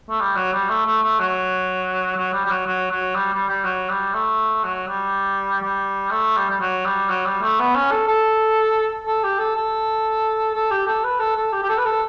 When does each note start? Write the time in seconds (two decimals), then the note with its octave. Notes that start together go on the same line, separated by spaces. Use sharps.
0.10 A3
0.20 G3
0.36 F#3
0.53 G3
0.69 A3
0.85 A3
1.02 A3
1.19 F#3
2.17 F#3
2.33 G3
2.45 G3
2.50 F#3
2.67 F#3
2.91 F#3
3.15 G3
3.32 G3
3.49 G3
3.65 F#3
3.90 G3
4.14 A3
4.64 F#3
4.88 G3
5.62 G3
6.11 A3
6.36 G3
6.50 G3
6.60 F#3
6.85 G3
7.10 F#3
7.26 G3
7.42 A3
7.60 B3
7.75 C#4
7.91 A4
8.08 A4
9.06 A4
9.24 G4
9.39 A4
9.56 A4
10.55 A4
10.71 G4
10.87 A4
11.04 B4
11.20 A4
11.36 A4
11.53 G4
11.63 G4
11.69 A4
11.78 B4
11.86 A4